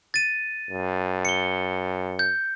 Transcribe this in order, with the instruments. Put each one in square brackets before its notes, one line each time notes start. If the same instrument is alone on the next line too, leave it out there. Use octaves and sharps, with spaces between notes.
[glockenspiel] A6 D#7
[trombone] F#2
[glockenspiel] C#7 G7
G6